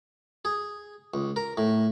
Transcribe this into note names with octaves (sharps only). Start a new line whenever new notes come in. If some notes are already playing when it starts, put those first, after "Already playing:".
G#4
C#2
A#4
A2